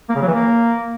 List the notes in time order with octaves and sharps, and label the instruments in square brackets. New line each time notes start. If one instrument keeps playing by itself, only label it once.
[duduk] A#3
C#3
F#3
E3
A#3